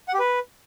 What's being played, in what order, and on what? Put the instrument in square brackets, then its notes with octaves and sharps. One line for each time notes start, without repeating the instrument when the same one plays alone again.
[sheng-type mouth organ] F#5
G4
B4